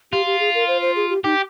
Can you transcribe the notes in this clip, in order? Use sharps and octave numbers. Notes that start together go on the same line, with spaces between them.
F4 G4
G4
G#4
A#4
C5
C5
G#4
G4
D#4 G4